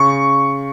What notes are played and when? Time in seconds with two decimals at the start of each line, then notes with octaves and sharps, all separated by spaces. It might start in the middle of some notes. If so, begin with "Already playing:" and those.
Already playing: C#3 C#6